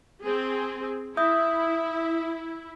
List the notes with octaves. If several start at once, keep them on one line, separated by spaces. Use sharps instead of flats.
C4 G#4
E4 E5 D#6 G6